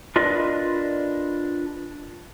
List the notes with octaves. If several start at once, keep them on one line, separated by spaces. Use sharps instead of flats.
D4 F4 A#4 B4 D5 D#5